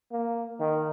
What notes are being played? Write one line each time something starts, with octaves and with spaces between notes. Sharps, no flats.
A#3
D#3